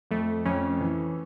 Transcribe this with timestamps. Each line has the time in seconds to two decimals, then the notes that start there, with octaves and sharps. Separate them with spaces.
0.11 F2 A3
0.45 F2 C#4
0.81 E3